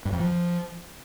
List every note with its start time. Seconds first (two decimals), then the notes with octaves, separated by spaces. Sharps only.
0.05 G2
0.12 F2
0.20 F3